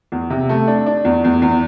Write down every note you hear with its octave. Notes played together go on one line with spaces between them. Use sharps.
E2
C3
A3
D4
D4
E2
E2
E2